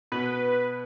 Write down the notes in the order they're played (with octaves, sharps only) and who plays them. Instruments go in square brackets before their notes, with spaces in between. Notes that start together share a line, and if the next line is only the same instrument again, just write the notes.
[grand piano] B2 B3 [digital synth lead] B4